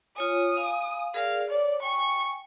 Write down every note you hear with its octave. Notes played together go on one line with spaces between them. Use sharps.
F4 C#5 G#5 D#6
F5 G#5 B5
G#4 A#4 D5 F5
C#5 D5
G5 G#5 C#6